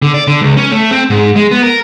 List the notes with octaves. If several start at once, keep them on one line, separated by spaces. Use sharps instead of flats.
D3
D5
D3
C#2
C#4
A3
C4
G#2
G#3
B3
A#4